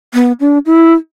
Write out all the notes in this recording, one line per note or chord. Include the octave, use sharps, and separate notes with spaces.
B3
D4
E4